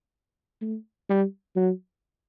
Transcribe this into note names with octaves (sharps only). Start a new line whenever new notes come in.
A3
G3
F#3